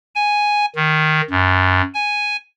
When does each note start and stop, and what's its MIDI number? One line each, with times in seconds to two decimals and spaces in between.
0.15 0.66 80
0.76 1.21 51
1.30 1.82 42
1.94 2.36 80